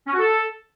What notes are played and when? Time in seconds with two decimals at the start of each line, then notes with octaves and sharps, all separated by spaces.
0.07 C#4
0.13 F#4
0.19 A4